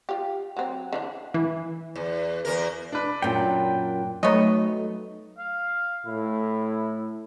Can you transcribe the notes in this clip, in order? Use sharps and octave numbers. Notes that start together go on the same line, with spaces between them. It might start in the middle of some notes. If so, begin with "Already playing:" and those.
F4 G4
F#3 C4
D3 E3 D4
E3
E2
E2 A#4
D4 B4
F#2 A#2 G5
F#3 A3 B3 D#4 C#5 D#5
F5
A2 E4